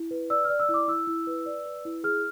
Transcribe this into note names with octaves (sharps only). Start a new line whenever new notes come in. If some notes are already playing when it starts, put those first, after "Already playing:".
Already playing: E4
B4
D5 E6
D5 F6
E6
E4
D6
E4 E6
E4
B4
D5
B4
E4
G#4 F6